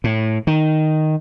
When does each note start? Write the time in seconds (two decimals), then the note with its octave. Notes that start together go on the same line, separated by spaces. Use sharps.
0.04 A2
0.47 D#3